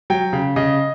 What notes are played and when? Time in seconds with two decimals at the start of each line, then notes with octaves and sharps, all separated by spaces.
0.10 F#3 G5
0.33 C#3
0.56 C#3 D#5